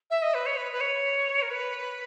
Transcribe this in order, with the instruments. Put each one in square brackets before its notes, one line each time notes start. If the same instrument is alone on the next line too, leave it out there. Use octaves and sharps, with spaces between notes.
[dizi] E5
D#5
B4
C#5
B4
B4
C#5
A#4
B4